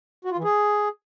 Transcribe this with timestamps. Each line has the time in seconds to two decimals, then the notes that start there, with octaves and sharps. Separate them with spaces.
0.25 F#4
0.31 F4
0.38 E3
0.44 G#4